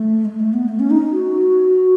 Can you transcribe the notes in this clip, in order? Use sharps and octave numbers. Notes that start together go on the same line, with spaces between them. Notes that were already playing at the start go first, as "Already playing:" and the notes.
Already playing: A3
G#3
A3
B3
A3
C#4
D#4
F#4